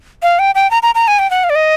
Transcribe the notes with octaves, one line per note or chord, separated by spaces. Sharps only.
F5
G5
G5
A#5
A#5
A#5
G#5
G5
F#5
F5
D5
D#5